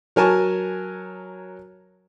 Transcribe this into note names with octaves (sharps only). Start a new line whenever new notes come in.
F#3 A#4 G#5 A5 C#6